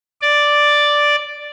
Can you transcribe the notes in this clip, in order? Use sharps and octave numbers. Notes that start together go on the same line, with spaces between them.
D5